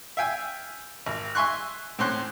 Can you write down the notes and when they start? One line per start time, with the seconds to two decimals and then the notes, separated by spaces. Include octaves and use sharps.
0.17 E5 F5 G5 G#5
1.06 G#1
1.35 E5 G#5 C6 C#6 F#6
1.99 A2 C4 C#4 C6 F#6